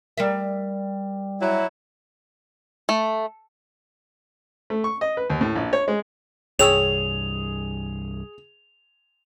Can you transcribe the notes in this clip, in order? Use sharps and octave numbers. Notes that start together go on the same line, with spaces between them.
G3 A#4 E5
F#3 E4
A3
A3
C#6
D#5
B4
D#2
A2
A#1
C#5
G#3
C2 G2 G#4 C#5 G5 E6 F7